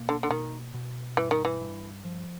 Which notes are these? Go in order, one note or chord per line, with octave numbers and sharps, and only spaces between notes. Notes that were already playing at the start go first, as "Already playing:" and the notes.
Already playing: B2 A#3
D3
D3
B2 D#3
B2
G2 E3
D#3
E3
G2
F3